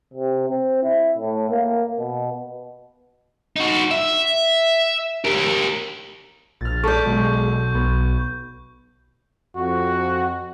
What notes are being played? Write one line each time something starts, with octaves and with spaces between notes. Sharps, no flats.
C3
C4
E4
A2
A#3
B2
D#4 F#4
E5
G4 A#4
A#1 F6 A6
A4 D5 C#6 D6 G6 B6
B1 G#3
B1 B3
F2 F#4